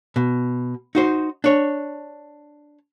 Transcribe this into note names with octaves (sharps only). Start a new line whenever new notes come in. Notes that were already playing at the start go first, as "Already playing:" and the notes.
B2
D#4 F#4 C5
D4 C#5